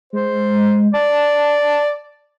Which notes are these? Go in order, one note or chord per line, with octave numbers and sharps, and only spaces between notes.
G#3 C5
D5 A5